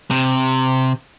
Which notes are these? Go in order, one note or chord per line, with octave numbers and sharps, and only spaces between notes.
C3